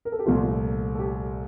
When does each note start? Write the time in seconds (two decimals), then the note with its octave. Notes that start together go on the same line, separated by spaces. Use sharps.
0.05 A#4
0.12 A4
0.19 G4
0.26 C2 A#2 F3 A3 F4
0.95 A4
0.99 G4